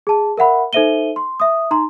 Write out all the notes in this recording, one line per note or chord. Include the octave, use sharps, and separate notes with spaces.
G#4 A5
A#4 E5 F#5 B5
D#4 A4 C5 E5 D#7 G7
C6
E5 D#6
D#4 A#5 C6